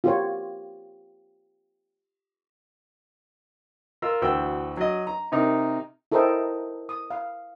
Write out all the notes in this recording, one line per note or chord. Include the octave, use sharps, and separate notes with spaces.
F4 G4 C#5
F4 A#4 E6
D2 E3 F#4 G5 E6
F#3 D#5
A#5
C3 D#4 A#4
E4 A4 A#4 C5 D#5 G5
D#6
F5